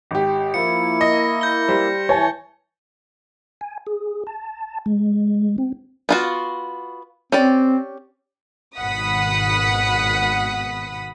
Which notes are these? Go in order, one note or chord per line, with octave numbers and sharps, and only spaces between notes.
G#1 G4
F3 A#3 E4 C#7
D#5 A#6
G6 G7
G3 C5
E3 C#5 G#5 A5
G#5
G#4
A5
G#3
C4
B3 F4 F#4
C4 C#4 G4 D5
G#1 B2 F#5 B5 D#6 B6